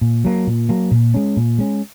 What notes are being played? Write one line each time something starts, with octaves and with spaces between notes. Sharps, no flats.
A#2
F#3 A#3
A#2
F#3 A#3
A#2
G#3 C#4
A#2
G#3 C#4